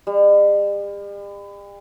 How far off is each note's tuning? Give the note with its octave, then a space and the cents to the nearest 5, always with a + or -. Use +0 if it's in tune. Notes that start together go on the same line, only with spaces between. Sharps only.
G3 +45